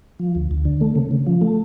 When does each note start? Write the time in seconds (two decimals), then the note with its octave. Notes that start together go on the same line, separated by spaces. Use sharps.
0.19 F3
0.35 D2
0.51 D2
0.65 D3
0.81 A3
0.96 C#3
1.11 C#3
1.27 F3
1.41 A3